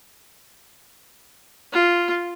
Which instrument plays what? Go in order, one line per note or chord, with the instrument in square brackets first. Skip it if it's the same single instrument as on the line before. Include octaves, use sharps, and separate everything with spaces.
[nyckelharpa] F4